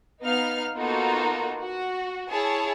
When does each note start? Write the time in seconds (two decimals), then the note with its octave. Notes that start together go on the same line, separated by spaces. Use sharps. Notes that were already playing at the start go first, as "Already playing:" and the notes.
0.22 B3 D#4 F5 F6
0.77 A#3 B3 D#4 F4 F#4 A4
1.60 F#4
2.30 E4 G#4 C#5 A5